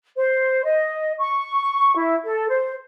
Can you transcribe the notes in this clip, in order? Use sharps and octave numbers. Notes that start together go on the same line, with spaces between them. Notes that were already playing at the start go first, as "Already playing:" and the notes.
C5
D#5
C#6
E4
A4
C5